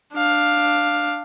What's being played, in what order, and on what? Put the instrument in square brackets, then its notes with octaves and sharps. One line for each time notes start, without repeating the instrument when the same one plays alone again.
[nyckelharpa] D4 F5